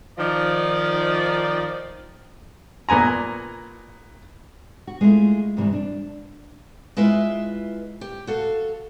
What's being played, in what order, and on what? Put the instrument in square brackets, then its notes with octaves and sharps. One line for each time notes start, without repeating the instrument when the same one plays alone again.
[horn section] D#3 F3 D5
[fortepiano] A#2 B3 G#5 A#5
[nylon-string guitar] F#4
G#3 A3 D4 E4 F4
G#2 C3 E3 G3 D4
D4
[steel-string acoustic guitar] G#3 E4 F4 B4 E5
G4
F#4 A4 F5